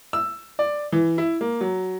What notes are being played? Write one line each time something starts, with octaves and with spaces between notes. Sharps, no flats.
E6
D5
E3
E4
A#3
F#3